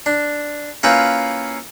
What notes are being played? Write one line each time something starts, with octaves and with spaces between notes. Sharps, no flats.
D4
A#3 C#4 E4 F4 B4 G5